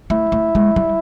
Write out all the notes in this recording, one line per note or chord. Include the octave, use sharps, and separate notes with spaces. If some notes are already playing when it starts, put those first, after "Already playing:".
A3 E4
A3
G#3
G3